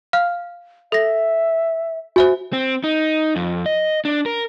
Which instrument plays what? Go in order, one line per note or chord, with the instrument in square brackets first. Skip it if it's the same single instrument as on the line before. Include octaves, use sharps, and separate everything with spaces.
[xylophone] F5 F6
[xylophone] A4 A#6 [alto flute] E5
[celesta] F#4 [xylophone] C5 E5 G#5
[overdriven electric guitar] C4
D#4
F2
D#5
D4
A#4